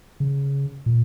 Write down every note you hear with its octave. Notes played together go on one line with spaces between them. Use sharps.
C#3
A#2